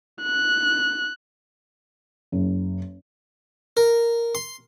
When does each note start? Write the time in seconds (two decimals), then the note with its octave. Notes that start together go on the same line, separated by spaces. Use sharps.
0.23 F#6
2.32 F#1
3.77 A#4
4.35 C6